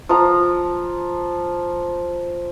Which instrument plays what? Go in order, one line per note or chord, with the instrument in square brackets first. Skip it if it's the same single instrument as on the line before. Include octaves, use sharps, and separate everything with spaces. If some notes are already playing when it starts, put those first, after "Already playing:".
[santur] F3 A#5